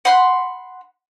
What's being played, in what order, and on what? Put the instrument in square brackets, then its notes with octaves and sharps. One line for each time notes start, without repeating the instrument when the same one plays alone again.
[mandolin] F#5 B5 C6 F#6